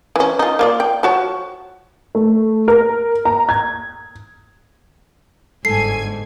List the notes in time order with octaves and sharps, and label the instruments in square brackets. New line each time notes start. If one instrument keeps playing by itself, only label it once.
[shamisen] E3 C#4
D#4 F4
A#3 F4 D5
G5
F3 F#4 C#5
[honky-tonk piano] A3
A#4
A#5
G#6
[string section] G1 G#5 G#6 [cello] G#2 [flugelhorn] A4 [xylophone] C7